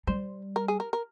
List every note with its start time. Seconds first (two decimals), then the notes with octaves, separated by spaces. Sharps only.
0.07 G3 C5
0.56 A#4
0.68 G#4
0.80 A#4
0.93 A#4